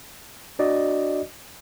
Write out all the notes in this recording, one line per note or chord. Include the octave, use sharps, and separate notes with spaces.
D4 F#4 D5 D#5